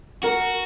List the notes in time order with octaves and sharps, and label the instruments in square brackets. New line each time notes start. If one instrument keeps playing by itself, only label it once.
[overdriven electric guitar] F#4 [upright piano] A#4